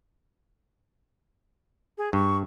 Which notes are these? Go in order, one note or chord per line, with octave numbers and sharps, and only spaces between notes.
G#4
G2 C#6